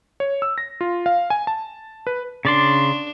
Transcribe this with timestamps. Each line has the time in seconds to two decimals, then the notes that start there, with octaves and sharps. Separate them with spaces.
0.20 C#5
0.42 E6
0.58 A#6
0.81 F4
1.06 F5
1.30 G#5
1.47 A5
2.07 B4
2.45 C#3 D4 D5 C6